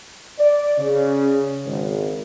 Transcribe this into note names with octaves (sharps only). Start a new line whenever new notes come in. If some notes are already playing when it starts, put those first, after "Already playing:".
D5
C#3
G#1